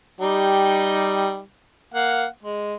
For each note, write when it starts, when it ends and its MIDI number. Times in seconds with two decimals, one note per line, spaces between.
0.21 1.39 55
0.21 1.39 63
0.21 1.39 67
1.94 2.25 58
1.94 2.25 77
1.94 2.25 78
2.43 2.74 56